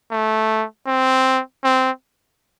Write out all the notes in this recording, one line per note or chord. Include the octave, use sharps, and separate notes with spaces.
A3
C4
C4